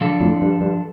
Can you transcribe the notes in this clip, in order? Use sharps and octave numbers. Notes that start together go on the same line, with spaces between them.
F3 D4 A4
F2 A2
G2
G2